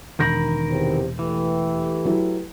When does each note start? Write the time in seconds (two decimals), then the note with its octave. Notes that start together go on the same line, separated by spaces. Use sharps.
0.19 E1 D#3 A#4 B5 G6 A#6
0.68 E2 C3
1.19 E3 A3 G4 B4
2.05 F#3 E4